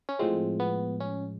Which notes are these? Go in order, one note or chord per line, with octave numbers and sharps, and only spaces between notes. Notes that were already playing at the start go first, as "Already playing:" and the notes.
C#4
A2 F3 G#3 C4
B3
C#4